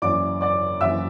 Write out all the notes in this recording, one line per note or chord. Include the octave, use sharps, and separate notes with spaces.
F#1 F#2 E3 D5 D6
D5 D6
F#1 F#2 E3 E5 E6